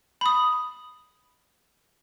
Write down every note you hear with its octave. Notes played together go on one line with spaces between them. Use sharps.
B5 D#6